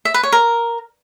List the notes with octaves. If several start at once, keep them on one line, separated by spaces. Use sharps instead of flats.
E5
B4
C#5
A#4